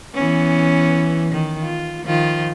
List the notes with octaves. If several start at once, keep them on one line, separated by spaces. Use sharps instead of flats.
E3 B3 C#4
D#3
F4
D#3 F3 F4